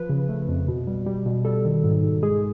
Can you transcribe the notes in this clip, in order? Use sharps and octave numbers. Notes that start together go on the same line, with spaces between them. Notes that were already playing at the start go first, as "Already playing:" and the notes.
Already playing: F3 B4
C#3
A3
F2
B2
G3
G3
B2
G3 A4
D#3
G#2
G#2
G#3 G#4